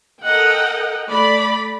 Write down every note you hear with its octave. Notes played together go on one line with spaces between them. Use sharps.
A4 A#4 D#5 F#5 G5
A3 D5 B5